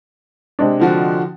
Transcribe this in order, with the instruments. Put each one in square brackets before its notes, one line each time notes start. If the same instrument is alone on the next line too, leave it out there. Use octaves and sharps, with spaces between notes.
[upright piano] C3 G#3 D4
[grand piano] D3 F3 F#4